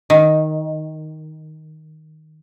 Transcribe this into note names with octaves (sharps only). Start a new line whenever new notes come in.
D#3